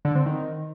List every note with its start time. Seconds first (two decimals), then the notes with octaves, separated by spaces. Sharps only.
0.05 D3
0.15 C4
0.26 D#3